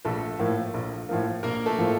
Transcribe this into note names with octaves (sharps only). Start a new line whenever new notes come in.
A#1 A3 A4
A2 F3 A#3
A#1
A2 F3 A#3
A#1 A#3 A#4
A3 A4
A2 F3 A#3